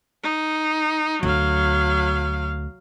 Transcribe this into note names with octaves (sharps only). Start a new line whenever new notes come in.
D#4
D2 F#3 F5